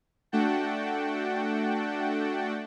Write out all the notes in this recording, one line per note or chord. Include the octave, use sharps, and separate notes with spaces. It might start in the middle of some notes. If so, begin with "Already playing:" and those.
A3 D4 F#4 F#5 G5 A5